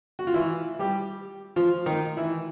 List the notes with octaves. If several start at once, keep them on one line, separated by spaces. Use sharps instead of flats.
F#4
F4
E3 E4
G3 G4
F3 F4
D#3 D#4
E3 E4